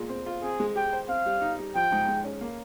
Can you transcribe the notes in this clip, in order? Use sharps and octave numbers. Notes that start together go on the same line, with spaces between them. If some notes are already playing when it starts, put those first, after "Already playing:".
Already playing: A#2 G#3
C4
F4
C4 G#4
G#3
G4 G5
C5
C4 F5
G3
D#4
G3
F3 G5
G#2
G#3
C#4
A#3